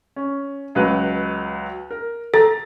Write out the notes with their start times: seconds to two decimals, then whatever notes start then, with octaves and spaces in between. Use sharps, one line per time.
0.16 C#4
0.75 C#2 F#3 B4
1.91 A#4
2.34 A4 A#5 A6